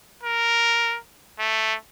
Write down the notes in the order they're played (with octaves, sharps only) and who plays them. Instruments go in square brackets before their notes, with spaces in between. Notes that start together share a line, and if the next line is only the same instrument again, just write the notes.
[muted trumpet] A#4
A3